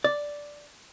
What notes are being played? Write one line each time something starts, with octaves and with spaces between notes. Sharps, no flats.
D5